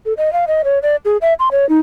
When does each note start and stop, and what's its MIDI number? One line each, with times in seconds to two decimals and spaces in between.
0.06 0.13 69
0.17 0.32 75
0.33 0.45 77
0.47 0.62 75
0.64 0.79 73
0.82 0.96 74
1.05 1.17 68
1.21 1.34 76
1.39 1.49 84
1.51 1.68 73
1.69 1.79 63